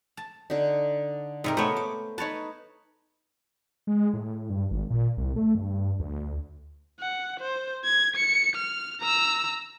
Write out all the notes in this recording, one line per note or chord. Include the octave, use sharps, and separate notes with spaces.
A5
D3 D#4
G#2 C3 A#4 D#5
A3 B3 C5 C#5
D6
D#4 B4 C#5 A5
G#3
A2
G2
G#1
A#2
C2
A3
G2
D2
F#5
C5
G#6
C#7
F6
A#5 E6